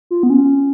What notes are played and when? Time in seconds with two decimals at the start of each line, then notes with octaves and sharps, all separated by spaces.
0.11 F4
0.23 B3
0.30 C#4